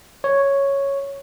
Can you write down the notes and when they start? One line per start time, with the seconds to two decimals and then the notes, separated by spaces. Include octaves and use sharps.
0.24 C#5